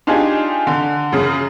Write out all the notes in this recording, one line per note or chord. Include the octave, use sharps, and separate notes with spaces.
D4 D#4 F4 G4 G#4 G#5
D3
F#2 C#3